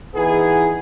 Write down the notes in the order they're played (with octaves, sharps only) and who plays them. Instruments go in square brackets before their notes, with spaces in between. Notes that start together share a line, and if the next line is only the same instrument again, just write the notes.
[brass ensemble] E3 B3 D#4 E4 G#4